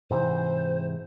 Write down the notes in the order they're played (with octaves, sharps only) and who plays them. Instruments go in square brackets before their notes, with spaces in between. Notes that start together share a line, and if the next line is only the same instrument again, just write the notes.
[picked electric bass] G#2 C3 E3 [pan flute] C5